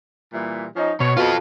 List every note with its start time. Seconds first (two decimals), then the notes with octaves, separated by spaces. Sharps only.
0.33 A#2 E3 G3
0.76 F3 C#4 D#4
1.00 B2 C#5
1.17 B2 F4 A4